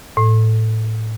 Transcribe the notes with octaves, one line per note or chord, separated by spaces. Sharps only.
A2